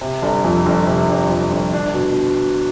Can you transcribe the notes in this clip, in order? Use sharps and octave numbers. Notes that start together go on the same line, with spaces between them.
C3
G1
F2
G1
C3
G1
F2
G1
D4
B2